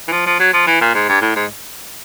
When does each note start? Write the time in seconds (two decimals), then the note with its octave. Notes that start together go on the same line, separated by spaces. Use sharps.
0.08 E3
0.12 F3
0.26 F3
0.40 F#3
0.53 F3
0.67 E3
0.81 A#2
0.95 G#2
1.09 G2
1.21 A2
1.36 G#2